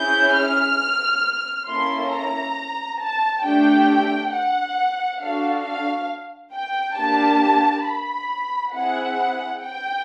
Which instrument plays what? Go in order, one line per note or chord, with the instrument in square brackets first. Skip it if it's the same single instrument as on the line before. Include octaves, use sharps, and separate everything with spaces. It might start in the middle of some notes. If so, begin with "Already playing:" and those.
Already playing: [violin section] C#4 E4 G#4 G6
F6
A#3 C#4 E4 A4 C6
A#5
A5
A3 D4 G4 G5
F#5
D4 F#4 A4 F5
F5
G5
A#3 D4 G4 A5
B5
C4 E4 G#4 F#5
G5